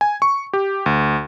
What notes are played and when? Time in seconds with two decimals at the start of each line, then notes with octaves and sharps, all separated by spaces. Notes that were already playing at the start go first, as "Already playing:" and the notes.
0.01 G#5
0.22 C#6
0.53 G4
0.86 D2